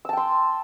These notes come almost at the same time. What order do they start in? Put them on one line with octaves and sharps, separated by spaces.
E6 A5 G5 C6